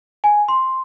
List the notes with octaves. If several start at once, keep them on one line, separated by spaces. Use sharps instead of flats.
G#5
C6